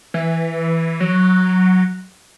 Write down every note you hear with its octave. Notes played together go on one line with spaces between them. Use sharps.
E3
F#3